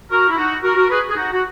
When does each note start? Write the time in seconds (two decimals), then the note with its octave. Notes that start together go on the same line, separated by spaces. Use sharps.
0.11 F#4 A#4
0.29 E4
0.37 D#4 F#4
0.63 F#4 A#4
0.76 F#4 A#4
0.90 G#4 B4
1.10 G#4
1.16 D#4 F#4
1.33 F#4